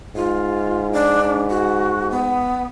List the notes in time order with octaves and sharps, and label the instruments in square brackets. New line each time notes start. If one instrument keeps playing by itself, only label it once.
[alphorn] G#2 [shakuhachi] F4
[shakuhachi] D4
F#4
B3